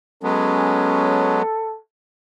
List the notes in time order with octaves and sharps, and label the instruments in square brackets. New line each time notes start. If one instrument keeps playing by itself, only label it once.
[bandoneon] F#3 G#3 B3 [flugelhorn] C#4 [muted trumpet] A4